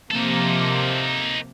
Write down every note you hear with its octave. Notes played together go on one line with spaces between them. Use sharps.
C3 F3 A#3 D#4 A4